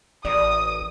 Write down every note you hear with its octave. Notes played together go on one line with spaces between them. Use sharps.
A1 A#4 D5 D#6